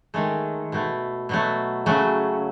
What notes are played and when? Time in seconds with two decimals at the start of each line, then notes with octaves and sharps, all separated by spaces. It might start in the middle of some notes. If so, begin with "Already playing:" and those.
0.14 D#3 G#3 A3
0.72 B2 A3
1.29 B2 F#3 A3
1.86 C#3 F#3 A3